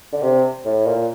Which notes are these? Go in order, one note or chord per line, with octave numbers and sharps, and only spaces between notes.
D3
C3
A2
A#2